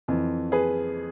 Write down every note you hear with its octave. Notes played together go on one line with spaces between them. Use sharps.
F2 E3
G#4 B4